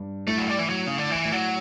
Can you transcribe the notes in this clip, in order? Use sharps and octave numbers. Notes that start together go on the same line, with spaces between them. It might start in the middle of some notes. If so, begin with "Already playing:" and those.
Already playing: G2
A2 A3
F#3
G3
E3
F#3
C#3
D3
E3
A2
F#3